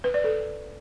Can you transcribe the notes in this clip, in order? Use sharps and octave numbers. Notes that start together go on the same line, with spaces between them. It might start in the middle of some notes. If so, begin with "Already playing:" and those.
B4
D5
A4